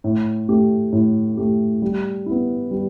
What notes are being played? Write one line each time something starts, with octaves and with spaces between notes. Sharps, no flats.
A2
A3 G4
A2
A3 G4
G3
E4
B3
G3